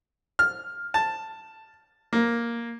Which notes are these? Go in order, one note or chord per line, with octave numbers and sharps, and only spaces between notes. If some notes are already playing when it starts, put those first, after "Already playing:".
F6
A5
A#3